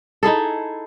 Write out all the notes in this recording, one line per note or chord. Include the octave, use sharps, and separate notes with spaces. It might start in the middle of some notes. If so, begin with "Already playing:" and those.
D#4 E4 G#4 A4